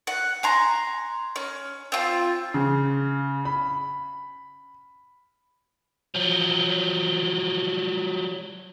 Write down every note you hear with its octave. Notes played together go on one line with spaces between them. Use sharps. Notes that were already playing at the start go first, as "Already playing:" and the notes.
F#5
G#5 A#5 C6
C#4
C4 F4
C#3
B5
F3 F#3